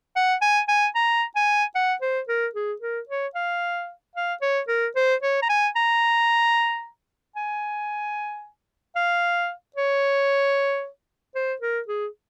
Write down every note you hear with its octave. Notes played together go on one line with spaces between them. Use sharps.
F#5
G#5
G#5
A#5
G#5
F#5
C5
A#4
G#4
A#4
C#5
F5
F5
C#5
A#4
C5
C#5
A#5
G#5
A#5
G#5
F5
C#5
C5
A#4
G#4